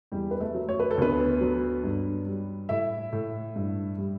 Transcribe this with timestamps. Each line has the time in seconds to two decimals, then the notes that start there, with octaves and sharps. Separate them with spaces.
0.12 E2 G3 G4
0.31 B4
0.40 A3 A4
0.54 F#3
0.69 C#5
0.80 B4
0.91 A4
0.97 D2 B3 B4
1.41 F#3
1.84 G2
2.26 G3
2.69 A2 E4 E5
3.12 A2
3.56 G2
3.98 G3